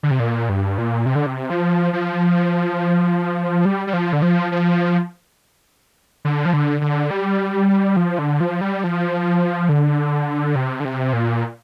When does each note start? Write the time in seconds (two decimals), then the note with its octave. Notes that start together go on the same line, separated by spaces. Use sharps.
0.03 D3
0.11 C3
0.20 A#2
0.49 G2
0.78 A#2
1.06 C3
1.15 D3
1.26 C3
1.50 F3
1.93 F3
3.65 G3
3.87 G3
3.93 F3
4.13 D3
4.22 F3
4.52 F3
6.25 D3
6.45 F3
6.53 D3
6.81 D3
7.11 G3
7.97 F3
8.19 D3
8.40 F3
8.61 G3
8.84 F3
9.69 D3
10.56 C3
10.80 D3
10.85 C3
11.13 A#2